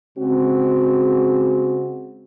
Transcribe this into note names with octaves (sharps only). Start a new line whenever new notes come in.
C#3 G#3 C4 F#4